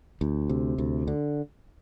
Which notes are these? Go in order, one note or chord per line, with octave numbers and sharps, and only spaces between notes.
D2
C3
D2
D3